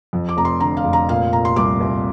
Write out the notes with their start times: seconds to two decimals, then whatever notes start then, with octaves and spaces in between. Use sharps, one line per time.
0.13 F2
0.29 D6
0.37 F1 A#5
0.45 C6
0.60 D3 A#5
0.77 F5
0.85 F1
0.93 A#5
1.09 A#2 F5
1.33 A#2 A#5
1.45 C6
1.56 C2 D6
1.81 C2